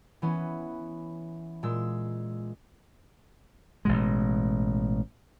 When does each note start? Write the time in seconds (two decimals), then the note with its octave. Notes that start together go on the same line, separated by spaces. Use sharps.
0.22 E3 B3 C#4
1.63 A#2 G#3 E6
3.85 A1 B2 G#3